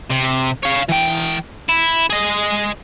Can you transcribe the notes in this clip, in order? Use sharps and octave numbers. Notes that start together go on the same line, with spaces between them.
C3
C#5 F5
E3 G5
E4
G#4 D#5